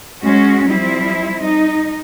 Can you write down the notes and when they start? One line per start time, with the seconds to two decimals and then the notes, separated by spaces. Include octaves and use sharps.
0.23 G#3 C#4 F#4
0.68 F3 G3 C4 E4
1.43 D#4